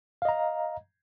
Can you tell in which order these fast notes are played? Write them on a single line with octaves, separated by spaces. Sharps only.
F5 D#5 A#5